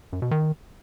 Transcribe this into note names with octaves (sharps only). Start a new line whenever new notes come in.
F#2
B2
D#3